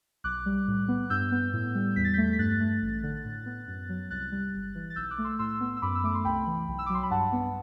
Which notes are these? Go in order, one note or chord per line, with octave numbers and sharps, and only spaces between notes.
B1 D6 F#6
G3
A2
B3
G2 E6 G6
B3
A2
G3
E2 B6
A6
A3 G6 B6
B6
G2 F#6 A6
A3
A1
D3
A2
B3
F#2
F#3
C2 F#6 A6
G3
G1
E3
A6
B1 E6 G6
D6 F#6
A3
C6 E6
A2 C6 E6
B3
E6
F#2 B5 D6
E6
A3 D6
C6
C2 G5 B5
E3
B1
E6
D6
F#3 C6
B5
G2 F#5 A5
B3